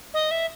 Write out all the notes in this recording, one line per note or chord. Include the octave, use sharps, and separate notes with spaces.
D#5
E5